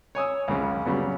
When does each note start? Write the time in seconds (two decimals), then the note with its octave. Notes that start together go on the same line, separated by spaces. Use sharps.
0.15 C#5 G#5 D#6 E6
0.48 C#2 F#2 C#3
0.86 C#3 F#3 G3 B3